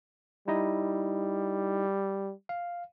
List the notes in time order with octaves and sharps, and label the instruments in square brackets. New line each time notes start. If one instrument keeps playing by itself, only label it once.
[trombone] G3 [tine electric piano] D#4 E4 D#5
[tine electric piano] F5